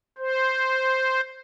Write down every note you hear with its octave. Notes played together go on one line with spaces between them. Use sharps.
C5